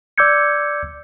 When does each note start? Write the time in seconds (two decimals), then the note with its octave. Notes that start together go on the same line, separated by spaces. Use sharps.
0.18 D5 D6 E6 G6 G#6 C#7